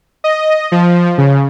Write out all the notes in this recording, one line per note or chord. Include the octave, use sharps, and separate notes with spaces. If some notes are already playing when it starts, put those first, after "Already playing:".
D#5
F3
C#3